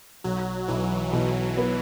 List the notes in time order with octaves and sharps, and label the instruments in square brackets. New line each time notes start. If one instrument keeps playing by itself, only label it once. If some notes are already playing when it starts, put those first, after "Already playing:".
[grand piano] B1 [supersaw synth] F#3
[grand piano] B1 [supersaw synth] E3
[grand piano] B2 [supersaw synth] E3
[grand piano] B3